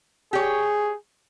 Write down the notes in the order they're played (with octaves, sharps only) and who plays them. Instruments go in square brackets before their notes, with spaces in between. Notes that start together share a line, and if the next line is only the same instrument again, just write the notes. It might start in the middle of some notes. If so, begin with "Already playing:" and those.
[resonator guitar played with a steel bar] G4 C#5 [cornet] G#4